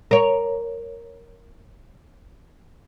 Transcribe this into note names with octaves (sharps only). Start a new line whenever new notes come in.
A#4 C#5